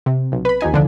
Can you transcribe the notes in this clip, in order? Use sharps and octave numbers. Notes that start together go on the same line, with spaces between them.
C3
B1
B4 B5
D#2 F3 D#4 G#5
C2 D3 F3 D4